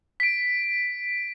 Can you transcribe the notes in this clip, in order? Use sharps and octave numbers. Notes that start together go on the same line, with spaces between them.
B6 D7